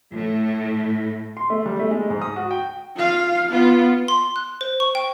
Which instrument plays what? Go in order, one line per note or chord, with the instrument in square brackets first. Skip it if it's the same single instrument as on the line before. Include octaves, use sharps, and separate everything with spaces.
[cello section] A2
[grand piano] C6
A3
G3
A3
G#3
G#2
D#6
F#4
G5
[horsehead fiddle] F4 F5
B3 F4
[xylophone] C6
F#6
C5
C#6
G5